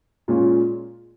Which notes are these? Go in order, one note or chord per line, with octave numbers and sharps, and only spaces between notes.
A#2 G#3 C#4 F4